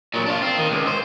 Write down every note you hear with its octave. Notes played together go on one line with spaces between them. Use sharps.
A#2 F#3
D4 F4
C4
D#3
C#2
C5